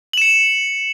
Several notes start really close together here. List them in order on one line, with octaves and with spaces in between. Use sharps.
F#7 E7 C#7